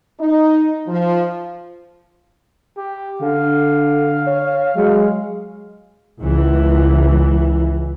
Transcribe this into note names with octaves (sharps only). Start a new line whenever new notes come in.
D#4
F3
G4
D3 F5
C#5
F#3 G#3
C#2 E3